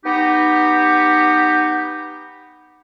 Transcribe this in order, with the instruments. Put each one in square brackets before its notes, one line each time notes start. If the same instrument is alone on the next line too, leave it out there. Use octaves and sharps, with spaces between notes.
[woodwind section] B3 D#4 G4